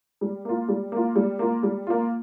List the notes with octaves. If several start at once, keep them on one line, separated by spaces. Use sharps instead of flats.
G3
A#3 F4
G3
A#3 F4
G3
A#3 F4
G3
A#3 F4